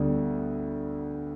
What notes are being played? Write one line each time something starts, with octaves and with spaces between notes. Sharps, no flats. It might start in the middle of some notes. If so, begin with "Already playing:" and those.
Already playing: D2 D3 G3 B3